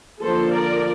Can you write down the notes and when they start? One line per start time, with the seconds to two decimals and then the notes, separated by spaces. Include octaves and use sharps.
0.21 D3 F3 A#3 A4 C5
0.51 A#4 D5